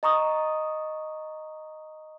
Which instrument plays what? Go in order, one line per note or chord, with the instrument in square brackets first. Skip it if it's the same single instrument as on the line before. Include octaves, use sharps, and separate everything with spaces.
[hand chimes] D#5 A#5 C#6 D#6